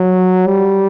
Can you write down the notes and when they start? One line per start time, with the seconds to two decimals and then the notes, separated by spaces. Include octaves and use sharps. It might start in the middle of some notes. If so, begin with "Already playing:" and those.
Already playing: F#3
0.46 G3